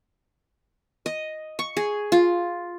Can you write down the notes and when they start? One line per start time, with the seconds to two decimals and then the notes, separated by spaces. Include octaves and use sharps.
1.06 D#5
1.59 C#6
1.77 G#4
2.12 F4